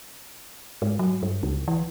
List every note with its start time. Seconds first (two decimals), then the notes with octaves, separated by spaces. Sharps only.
0.82 G#2
0.99 F#3
1.23 G2
1.43 C#2
1.68 E3